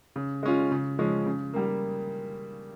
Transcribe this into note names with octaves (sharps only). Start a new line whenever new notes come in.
C#3
G#3 C#4 F4
C#3
F3 G#3 C#4
C#3
G3 A#3